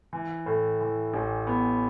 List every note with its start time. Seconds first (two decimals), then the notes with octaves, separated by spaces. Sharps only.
0.13 E3
0.46 A2
0.80 E3
1.14 A1
1.47 B3